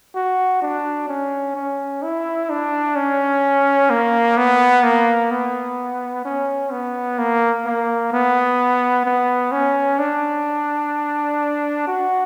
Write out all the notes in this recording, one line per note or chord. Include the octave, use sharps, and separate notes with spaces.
F#4
D4
C#4
C#4
E4
D4
C#4
A#3
B3
A#3
B3
C#4
B3
A#3
A#3
B3
B3
C#4
D4
F#4